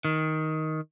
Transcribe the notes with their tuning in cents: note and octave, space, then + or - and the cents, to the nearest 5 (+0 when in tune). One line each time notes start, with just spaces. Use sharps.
D#3 +10